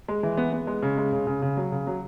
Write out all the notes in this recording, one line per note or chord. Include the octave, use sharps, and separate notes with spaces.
G#3
E3
B3
B3
G#3
C#3
G#3
C#3
C#3
C#3
F#3
C#3
F#3